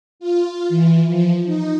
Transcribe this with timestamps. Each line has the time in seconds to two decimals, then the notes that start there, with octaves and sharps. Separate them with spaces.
0.20 F4
0.69 E3
1.07 F3
1.46 D#4